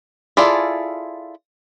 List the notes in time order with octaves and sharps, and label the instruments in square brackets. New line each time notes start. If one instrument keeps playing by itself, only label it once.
[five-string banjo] E4 F4 G#4 A4 D5